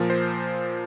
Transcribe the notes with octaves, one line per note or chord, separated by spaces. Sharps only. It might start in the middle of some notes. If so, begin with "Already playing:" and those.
Already playing: A#2 F3 A#4
C5